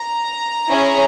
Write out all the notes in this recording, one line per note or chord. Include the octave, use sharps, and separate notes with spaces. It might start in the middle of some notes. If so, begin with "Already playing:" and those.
Already playing: A#5
C#4 E4 G#4